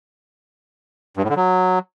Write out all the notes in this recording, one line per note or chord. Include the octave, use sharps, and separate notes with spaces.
G2
A2
D3
F#3